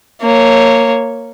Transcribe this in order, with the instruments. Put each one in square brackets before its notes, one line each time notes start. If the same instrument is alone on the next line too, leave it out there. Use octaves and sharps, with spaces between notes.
[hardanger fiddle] A#3 C#5